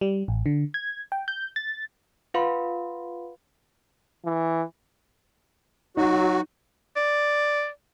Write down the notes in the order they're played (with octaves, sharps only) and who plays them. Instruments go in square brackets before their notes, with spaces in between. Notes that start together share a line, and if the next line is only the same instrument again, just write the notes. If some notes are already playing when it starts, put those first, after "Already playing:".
[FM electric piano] G3
A1
D3
G#6
G5
G6
A6
[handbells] F4 B4 F5 F#5 B5 C6
[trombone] E3
[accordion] F#3 F#4 [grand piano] D#4
[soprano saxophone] D5